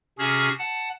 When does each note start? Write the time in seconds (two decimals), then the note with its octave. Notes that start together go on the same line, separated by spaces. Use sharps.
0.19 C3 C#4 F#4 G#4 F6 G#6
0.59 F#5 A5